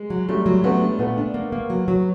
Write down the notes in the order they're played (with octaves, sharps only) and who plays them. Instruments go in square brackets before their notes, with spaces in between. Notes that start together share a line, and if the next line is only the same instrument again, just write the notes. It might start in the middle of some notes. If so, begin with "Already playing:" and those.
Already playing: [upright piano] G#3
[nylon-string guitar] F#3
[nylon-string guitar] F#3 [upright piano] G3 A3
[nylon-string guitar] F#3
[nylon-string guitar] F#3 [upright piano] A3 B3
[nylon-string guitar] D4
[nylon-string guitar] A#2 [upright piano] A3 B3
[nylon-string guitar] D4
A#3
A#3
F#3
F#3